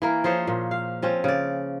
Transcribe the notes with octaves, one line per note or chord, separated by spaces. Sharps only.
E3 A#3 A#4
F3 G#4 C5 C#5
A#2
F5
F3 C4 C#4
C#3 D5